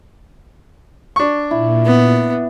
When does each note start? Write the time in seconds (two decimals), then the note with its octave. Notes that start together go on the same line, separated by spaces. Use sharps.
1.16 D4 C#6
1.51 A#2 E4
1.86 B3